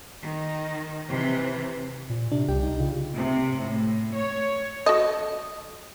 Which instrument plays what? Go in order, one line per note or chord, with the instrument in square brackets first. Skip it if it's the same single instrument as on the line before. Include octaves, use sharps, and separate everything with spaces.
[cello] D#3
C3 E3
[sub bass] A#2
[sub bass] C3 [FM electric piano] D4
[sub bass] C2 [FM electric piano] G4 G5
[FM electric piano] D#4
[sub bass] C#3 [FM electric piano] F4
[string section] C3
A2
C#5
[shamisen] F#4 A4 D#5